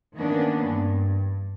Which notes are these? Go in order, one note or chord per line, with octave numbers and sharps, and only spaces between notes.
D#3 E3 A#3 B3 C#4 D4
G2